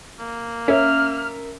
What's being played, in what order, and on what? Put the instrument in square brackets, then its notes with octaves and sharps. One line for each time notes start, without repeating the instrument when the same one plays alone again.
[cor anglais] A#3
[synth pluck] C#4 [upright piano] A#4 E5 [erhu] F6